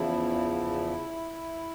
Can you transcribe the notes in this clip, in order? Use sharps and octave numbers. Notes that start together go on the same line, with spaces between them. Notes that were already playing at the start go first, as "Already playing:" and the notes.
Already playing: E2 C#3 F3 E4